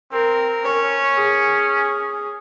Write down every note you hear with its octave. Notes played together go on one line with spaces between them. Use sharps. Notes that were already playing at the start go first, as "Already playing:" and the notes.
C4 A#4
C#4 C#5
G#4